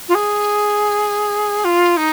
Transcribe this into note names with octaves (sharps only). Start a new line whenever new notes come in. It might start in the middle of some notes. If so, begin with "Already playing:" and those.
F4
G#4
F4
D#4